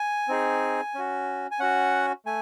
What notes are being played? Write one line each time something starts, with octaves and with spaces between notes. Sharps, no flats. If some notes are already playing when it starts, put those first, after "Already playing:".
Already playing: G#5
C4 D#4 G#4
C#4 F#4
G#5
C#4 F#4 F#5
A3 G#5